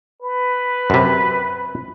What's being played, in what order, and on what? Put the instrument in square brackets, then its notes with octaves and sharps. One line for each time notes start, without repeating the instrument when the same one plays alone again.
[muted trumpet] B4
[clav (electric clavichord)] F#2 C3